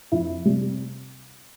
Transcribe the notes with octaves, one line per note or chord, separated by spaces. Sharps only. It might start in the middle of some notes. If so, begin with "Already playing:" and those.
F2 E4
C3 G3